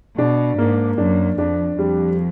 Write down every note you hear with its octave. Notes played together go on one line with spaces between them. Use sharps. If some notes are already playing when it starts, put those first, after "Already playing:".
B2 D4
G#2 A#3
F#2 D4
F2 D4
F2 G3